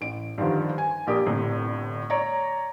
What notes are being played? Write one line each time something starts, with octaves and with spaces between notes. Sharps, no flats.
A1 D7
G2 D3 D#3 F3
G#5
A#1 G4 A#4 D#6
G1 A2 C3
C#5 D5 A#5